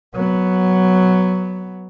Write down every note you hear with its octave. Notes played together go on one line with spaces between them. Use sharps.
F#3 B3